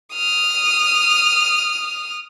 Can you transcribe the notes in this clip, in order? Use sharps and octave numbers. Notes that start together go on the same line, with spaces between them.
D#6 F6